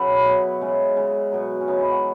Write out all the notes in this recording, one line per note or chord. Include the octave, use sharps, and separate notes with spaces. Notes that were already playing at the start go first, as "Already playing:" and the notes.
Already playing: C#3 F#3 B4 E5 F#5
E4
B2 F#3
C#3 G#3
C#3 G#3
B2 F#3
C#4
C#3 E3 G#3 D#4
E4
F#4